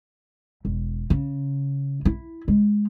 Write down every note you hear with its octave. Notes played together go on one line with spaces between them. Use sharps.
E1
C#3
E4
G#3